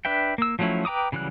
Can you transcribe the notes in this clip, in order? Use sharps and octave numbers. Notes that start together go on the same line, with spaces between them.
D4 B4 E5 G5
A#3 E6
F3 F#3 A3 C#4 E4
B4 G5 A#5 D6 D#6
C#3 E3 F#3 G3 F#6